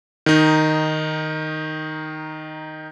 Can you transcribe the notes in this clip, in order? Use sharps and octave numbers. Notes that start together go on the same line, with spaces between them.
D#3 D#4